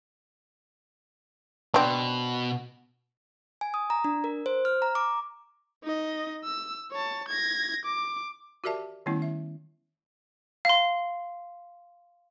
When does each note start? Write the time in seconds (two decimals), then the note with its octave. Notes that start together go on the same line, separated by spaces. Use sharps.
1.74 B2 C4 D4
3.61 G#5
3.74 D#6
3.90 A#5
4.04 D4
4.24 A#4
4.46 C5
4.65 F6
4.82 A#5
4.95 D6
5.83 D#4 D#5
6.44 E6
6.91 C#5 A5
7.29 G#6 A#6
7.85 D6
8.64 F#4 G4 A#4 D5 E5 A5
9.06 D#3 G3 A3 B3 C#4 E4
9.22 E5
10.65 F5 C6